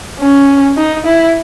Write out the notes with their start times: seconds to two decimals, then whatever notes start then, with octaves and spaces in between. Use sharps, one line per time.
0.20 C#4
0.77 D#4
1.06 E4